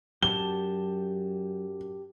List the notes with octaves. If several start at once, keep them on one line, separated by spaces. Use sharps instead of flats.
F#2 F#3 G4 A5 G7